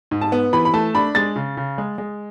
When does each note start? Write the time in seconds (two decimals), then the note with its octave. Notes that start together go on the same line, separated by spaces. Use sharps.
0.11 G#2
0.21 A5
0.32 B3
0.53 E3 B5
0.65 B5
0.74 A3 A5
0.95 D4 B5
1.15 G#3 A6
1.36 C#3
1.57 C#3
1.78 G#3
1.98 G#3